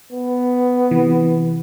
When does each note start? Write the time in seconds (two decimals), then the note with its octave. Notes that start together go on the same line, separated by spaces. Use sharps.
0.12 B3
0.91 C3 E3